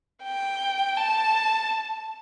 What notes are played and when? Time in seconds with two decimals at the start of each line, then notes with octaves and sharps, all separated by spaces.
0.23 G5
0.97 A5